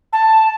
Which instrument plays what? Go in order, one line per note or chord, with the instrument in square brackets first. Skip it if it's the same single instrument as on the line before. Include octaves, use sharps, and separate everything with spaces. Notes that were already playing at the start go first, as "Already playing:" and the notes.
[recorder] A5